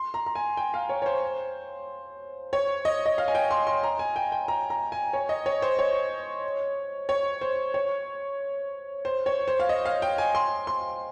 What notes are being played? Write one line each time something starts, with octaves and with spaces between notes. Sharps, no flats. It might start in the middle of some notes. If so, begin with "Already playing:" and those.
Already playing: C6
A#5
A#5
G#5
G5
F5
C#5
C#5
C5
C#5
D#5
D#5
F5
G#5
G5
C6
C6
A#5
G#5
G5
G5
A#5
A#5
G#5
C#5
D#5
C#5
C5
C#5
C#5
C5
C#5
C5
C#5
C5
F5
D#5
F5
G5
G#5
C6
C6